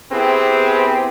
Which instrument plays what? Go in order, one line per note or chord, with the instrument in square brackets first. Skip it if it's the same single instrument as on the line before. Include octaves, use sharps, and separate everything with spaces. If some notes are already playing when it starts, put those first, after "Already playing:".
[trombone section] B3 C4 E4 G4 G#4 B4